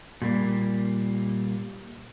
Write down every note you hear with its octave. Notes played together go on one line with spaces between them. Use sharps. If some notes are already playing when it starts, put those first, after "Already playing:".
A#2 G3 A#3